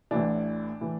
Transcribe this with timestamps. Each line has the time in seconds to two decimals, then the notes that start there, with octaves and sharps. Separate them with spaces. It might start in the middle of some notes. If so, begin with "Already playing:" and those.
0.11 A1 A2 E3 D4
0.81 A2 E3